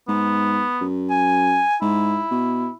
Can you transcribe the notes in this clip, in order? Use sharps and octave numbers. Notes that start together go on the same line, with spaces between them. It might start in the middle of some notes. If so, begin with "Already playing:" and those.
G#2 B3
F#2
G#5
G#2 E4
B2